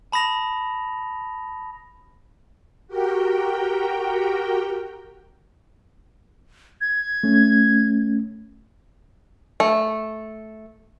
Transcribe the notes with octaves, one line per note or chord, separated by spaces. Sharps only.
A5 B5 D#6 A#6 F7
F#4 G4 A#4 G5
G#6
A3 C#4
A3